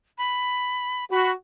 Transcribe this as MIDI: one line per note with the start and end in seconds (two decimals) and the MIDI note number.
0.18 1.05 83
1.11 1.32 66
1.11 1.30 83